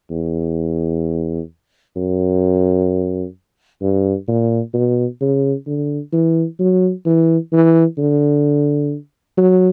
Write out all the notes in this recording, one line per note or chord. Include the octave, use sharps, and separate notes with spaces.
E2
F#2
G2
A#2
B2
C#3
D3
E3
F#3
E3
E3
D3
F#3